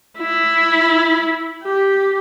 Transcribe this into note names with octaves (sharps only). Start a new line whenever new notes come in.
E4
G4